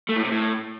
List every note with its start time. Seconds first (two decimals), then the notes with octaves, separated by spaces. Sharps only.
0.09 A3
0.16 A2
0.24 C3
0.32 A2